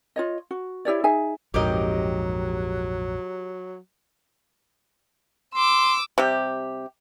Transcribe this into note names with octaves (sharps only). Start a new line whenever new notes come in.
F4 C#5 D#5
F#4
E4 G4 C#5 D5
D#4 G#4 E5 G#5
A#1 F2 G#2 F#3 G4 A#4 D#5
C6 D6 E6
C3 G3 G4